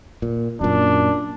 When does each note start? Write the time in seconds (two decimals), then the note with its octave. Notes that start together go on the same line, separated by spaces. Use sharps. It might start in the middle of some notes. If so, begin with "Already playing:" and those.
0.22 A#2
0.61 F#2 A#2 D4